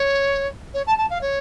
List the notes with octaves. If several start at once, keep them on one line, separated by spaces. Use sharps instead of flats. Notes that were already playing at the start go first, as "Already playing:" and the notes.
Already playing: C#5
C#5
A5
A5
F5
C#5